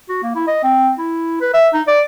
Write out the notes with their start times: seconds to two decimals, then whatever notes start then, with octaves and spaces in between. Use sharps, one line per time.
0.09 F#4
0.23 A#3
0.35 E4
0.47 D#5
0.63 C4
0.98 E4
1.41 B4
1.54 E5
1.74 D#4
1.87 D5